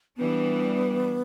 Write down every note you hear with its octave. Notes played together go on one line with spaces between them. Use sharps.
E3 G3 B3 D4